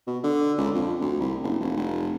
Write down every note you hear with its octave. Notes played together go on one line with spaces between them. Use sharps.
B2
D3
C#2
F2
D2
C2
F#1
F1
F1